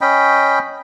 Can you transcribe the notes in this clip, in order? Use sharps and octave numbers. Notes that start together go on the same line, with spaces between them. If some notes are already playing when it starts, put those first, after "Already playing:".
C#4 D#5 G5 B5